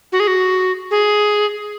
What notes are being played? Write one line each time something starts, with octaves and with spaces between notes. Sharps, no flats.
F#4
G#4
F#4
G#4